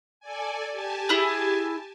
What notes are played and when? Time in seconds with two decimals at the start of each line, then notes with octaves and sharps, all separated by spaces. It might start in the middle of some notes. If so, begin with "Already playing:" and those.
0.20 A4 D5 G#5
0.72 G4 G#5 A5
1.09 E4 G#4